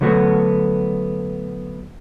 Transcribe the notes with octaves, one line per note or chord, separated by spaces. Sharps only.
D3 F#3 A3 B3 F#4